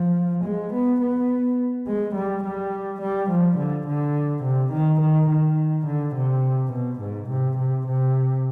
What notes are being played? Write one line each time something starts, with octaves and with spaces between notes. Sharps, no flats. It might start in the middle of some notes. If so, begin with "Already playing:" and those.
Already playing: F3
G#3
B3
B3
G#3
G3
G3
G3
F3
D3
D3
C3
D#3
D#3
D#3
D3
C3
B2
G#2
C3
C3
C3